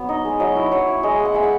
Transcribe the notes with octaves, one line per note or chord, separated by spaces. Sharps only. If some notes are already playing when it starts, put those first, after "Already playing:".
Already playing: F#3 B3
D#4 D#5
G#3
F#3 D#5
E4
F#3 C#5
E4
G#3 D#5
G#3
F#5
G#3 E5
F#5